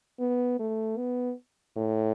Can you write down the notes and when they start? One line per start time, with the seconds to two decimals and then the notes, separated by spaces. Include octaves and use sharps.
0.20 B3
0.59 A3
0.97 B3
1.77 A2